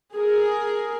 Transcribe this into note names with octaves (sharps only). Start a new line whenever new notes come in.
G#4 A#4